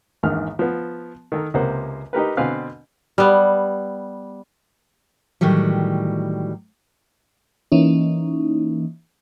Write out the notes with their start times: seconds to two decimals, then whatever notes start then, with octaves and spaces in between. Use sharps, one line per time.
0.23 A#1 E2 G#2 D#3 F6
0.59 F3 B3
1.32 D#3 A4 A#4
1.54 C#2 C3 A#3 C5 F#5
2.13 D#4 G4 A#4 B4
2.37 B2 D3 C4 B4 F5 G#5
3.18 G3 B3
5.41 A2 D#3 E3 F#3 G3
7.72 E3 A#3 C#4 D#4